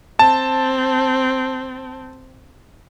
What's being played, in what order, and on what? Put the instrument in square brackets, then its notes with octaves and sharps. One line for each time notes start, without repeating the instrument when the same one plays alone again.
[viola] C4 [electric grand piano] A5